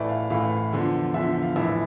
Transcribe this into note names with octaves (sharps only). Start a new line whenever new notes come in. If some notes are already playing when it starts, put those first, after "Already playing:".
Already playing: A1 A2 E3 A3 D5
F5
A1 A2 E3 A3 F5
E2 D3 F3
E2 D3 F3 E5
F5
A#1 A2 E3 E5